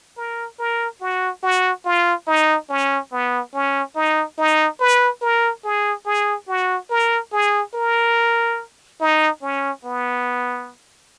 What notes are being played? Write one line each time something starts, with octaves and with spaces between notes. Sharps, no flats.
A#4
A#4
F#4
F#4
F4
D#4
C#4
B3
C#4
D#4
D#4
B4
A#4
G#4
G#4
F#4
A#4
G#4
A#4
D#4
C#4
B3